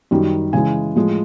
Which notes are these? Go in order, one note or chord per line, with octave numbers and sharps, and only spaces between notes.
F#2 D#3 G3
C#3 E3 G#3 G#5
A2 F3 G#3